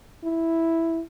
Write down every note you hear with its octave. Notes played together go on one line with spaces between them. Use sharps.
E4